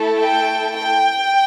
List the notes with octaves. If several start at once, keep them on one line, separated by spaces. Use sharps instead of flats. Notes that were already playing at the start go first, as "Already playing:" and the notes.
Already playing: A3 E4 A4
G5
G5